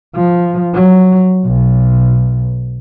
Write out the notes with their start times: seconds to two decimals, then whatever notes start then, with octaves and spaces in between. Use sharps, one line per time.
0.15 F3
0.74 F#3
1.46 B1